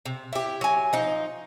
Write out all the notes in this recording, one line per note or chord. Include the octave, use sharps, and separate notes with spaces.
C3
E4 G4
F#3 G#5
F3 D#4